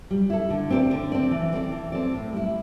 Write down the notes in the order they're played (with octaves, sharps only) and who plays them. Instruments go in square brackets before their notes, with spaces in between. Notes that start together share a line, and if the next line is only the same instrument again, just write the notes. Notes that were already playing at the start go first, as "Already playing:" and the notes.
[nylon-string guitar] G3
E4 A4
D3
C4 A4 D5
D3
C4 A4 D5
E3
C4 A4 D5
E3
C4 A4 D5
A2
G3 E4